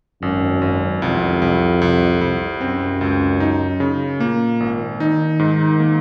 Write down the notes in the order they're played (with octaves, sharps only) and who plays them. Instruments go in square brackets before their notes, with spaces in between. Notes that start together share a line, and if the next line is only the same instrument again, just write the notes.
[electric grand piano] G#1 [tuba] F#2
[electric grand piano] G#1
[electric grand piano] C2 [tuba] F2
[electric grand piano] C2
C2
C2
[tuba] F#2 [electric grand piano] C4
[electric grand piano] C#2
D#4
C#3
[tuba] A#2 [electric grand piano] A#3
[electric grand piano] G#1
[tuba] D#3 [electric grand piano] D#4
[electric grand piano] G#2
A#3